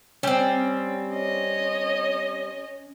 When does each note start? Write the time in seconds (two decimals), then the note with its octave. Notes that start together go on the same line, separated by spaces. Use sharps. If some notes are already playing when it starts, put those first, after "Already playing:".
0.23 G3 C4 C#4
1.14 C#5 D#5